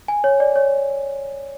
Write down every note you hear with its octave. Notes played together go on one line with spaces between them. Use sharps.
G#5
C#5
D5
C#5